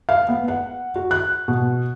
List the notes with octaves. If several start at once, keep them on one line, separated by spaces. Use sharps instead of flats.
F5
B3
F#5
F#4
F#6
B2